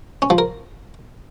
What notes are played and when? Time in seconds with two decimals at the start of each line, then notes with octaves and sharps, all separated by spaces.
0.22 C#4
0.30 F3
0.38 A#4